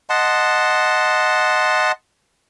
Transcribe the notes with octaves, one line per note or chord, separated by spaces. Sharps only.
D#5 F#5 A5 C6